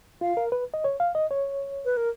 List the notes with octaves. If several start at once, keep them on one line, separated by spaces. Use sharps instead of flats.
F4 F5
A#4
B4
D#5
C#5
F5
D#5
C#5
B4
A#4